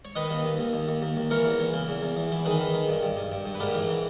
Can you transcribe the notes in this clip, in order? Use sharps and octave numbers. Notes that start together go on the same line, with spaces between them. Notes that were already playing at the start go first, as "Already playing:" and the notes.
C#5
D#3 B4 D#5
D#2
D#2
D#2
D#2
D#2
D#2
D#2
E3 A#4 C#5
E2
E3
C#3
E2
E2
E2
E3
D#3 G#4 B4
D#3
D#3
G2
G2
G2
G2
G2
B4
G#2 G4 A#4
E3
E3